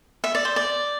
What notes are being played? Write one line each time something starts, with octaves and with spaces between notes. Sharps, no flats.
E5
D5
C5
D5